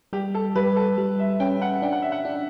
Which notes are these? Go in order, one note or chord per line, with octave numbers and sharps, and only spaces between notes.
G3 G4
A4
G3 B4
A4
G3
E5
C#4 G5
F#5
D4 G5
F#5
E5
F#5
D4